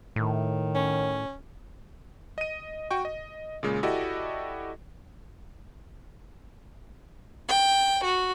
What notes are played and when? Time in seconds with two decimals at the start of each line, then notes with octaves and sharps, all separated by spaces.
0.16 A2 D#3
0.75 C#4
2.38 D#5 D#7
2.91 F#4 G5 C#6
3.05 D#5
3.63 A#2 C#3 G#3
3.83 E4 F#4 G4 A4 D5 D#5
7.48 G5
8.04 F#4